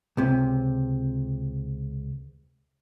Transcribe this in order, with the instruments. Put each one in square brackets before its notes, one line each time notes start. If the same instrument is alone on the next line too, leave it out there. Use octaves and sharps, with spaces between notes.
[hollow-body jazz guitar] C#2 C3